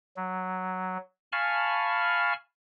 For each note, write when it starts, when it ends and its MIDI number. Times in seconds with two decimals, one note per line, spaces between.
0.16 0.98 54
1.32 2.33 77
1.32 2.33 80
1.32 2.33 81
1.32 2.33 83
1.32 2.33 85
1.32 2.33 89